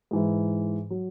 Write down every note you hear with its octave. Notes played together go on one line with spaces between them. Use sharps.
G#2 E3 G#3
F#3